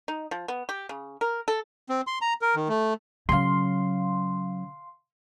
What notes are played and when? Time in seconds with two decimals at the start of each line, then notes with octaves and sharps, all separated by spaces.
0.08 D#4
0.31 F3
0.48 B3
0.69 G4
0.89 C#3
1.21 A#4
1.48 A4
1.89 C4
2.07 C6
2.21 A#5
2.42 A#4
2.56 D#3
2.69 A3
3.29 C#3 F#3 F5 C6